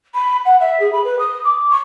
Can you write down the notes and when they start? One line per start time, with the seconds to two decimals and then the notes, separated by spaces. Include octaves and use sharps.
0.14 B5
0.45 F#5
0.60 E5
0.80 G#4
0.92 B5
1.04 B4
1.19 D#6
1.44 D6
1.70 C#6